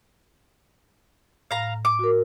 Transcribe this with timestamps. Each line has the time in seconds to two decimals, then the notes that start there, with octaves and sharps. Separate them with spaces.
1.51 A2 F5 A#5
1.85 D6
1.99 F#4 A#4